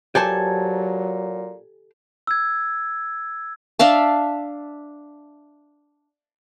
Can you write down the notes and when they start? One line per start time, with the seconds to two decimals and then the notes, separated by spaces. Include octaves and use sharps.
0.15 A#2 F#3 G4 A4 C5 G#5 A5
2.27 E6 G#6
3.79 D4 E5 F5 A5